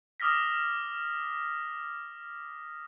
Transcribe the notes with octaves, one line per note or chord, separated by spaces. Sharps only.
D6 D#6 F6 A#6 B6